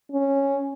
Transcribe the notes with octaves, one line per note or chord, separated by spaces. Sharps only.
C#4